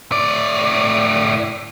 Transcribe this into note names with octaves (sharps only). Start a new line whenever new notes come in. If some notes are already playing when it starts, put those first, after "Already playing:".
A2 D5